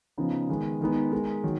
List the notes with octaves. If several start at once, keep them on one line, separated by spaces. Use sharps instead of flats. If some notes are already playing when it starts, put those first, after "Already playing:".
C#3 F3 B3 D#4
D#3 G#3 B3
D#3 G#3 B3 D#4
G#3 D#4 A#4
D#3 F#3